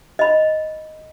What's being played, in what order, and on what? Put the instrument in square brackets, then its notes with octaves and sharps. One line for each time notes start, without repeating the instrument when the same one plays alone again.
[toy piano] D#5 B5